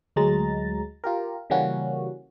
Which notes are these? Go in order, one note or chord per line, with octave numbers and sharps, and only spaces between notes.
D2 F#3 G#3 A#5 A6
F4 G4 A#4
C#3 E3 G3 A#3 C#4 F#4